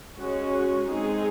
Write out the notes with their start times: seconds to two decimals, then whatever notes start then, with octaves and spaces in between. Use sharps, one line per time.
0.17 G#3 C#4 F#4
0.88 G#3 C4 D#4 G#4